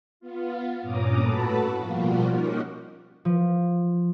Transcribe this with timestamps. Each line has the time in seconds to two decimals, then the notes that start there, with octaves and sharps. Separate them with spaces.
0.20 B3 F4
0.81 G2 A#2 C#4 A#5 D6 D#6
1.18 A2 F#4 A4 B4 A5 B5
1.78 B2 F3 G3 A#3 F4 F#4
2.31 A#3 C#4 D#4 G4 A#4 F#5
3.25 F3